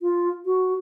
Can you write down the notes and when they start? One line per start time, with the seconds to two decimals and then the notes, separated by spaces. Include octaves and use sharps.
0.01 F4
0.46 F#4